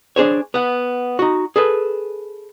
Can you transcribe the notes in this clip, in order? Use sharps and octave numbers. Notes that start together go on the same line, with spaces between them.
D4 G#4 C5 C#5
B3 F#5
D#4 F#4
G#4 A4 B4